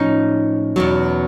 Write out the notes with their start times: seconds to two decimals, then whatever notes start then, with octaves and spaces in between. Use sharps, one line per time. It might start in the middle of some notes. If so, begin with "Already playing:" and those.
Already playing: A2 F3 C#4 D#4
0.76 E2 B2 F#3